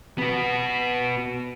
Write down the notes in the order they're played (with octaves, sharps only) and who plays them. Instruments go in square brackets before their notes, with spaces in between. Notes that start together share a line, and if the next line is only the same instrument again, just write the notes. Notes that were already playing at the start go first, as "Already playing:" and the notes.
[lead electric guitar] B3 F#4